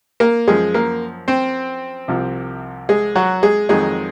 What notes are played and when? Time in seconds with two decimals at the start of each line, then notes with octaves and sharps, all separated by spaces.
0.20 A#3 A#4
0.48 F#2 F3 G#3 G#4
0.74 A#3 A#4
1.28 C4 C5
2.08 C2 C3 F3
2.89 G#3 G#4
3.15 F#3 F#4
3.43 G#3 G#4
3.69 F2 D#3 F#3 G#3 G#4